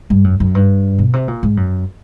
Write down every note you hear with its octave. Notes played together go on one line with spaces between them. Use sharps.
G2
F#2
F#2
G2
B2
C3
A#2
G#2
F#2